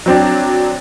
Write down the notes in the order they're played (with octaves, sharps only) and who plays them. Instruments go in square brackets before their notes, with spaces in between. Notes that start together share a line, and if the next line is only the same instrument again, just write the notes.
[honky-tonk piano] F#3 C4 D4